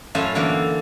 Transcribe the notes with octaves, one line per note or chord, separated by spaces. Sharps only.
F#2 A2 F4 F5 G#5 A5
D3 E3 A#3